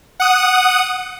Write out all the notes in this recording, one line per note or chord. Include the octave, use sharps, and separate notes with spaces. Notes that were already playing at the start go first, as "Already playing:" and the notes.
F#5 D#6